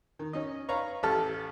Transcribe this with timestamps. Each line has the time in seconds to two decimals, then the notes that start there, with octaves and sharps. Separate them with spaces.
0.19 D#3
0.33 C#4 D#4 D#5
0.69 B4 C#5 F5 A#5 C#6
1.03 A1 G4 A4 A5 F6